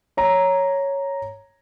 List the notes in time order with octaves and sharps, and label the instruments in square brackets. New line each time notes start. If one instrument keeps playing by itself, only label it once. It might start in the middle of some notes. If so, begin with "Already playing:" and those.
[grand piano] C#5 A#5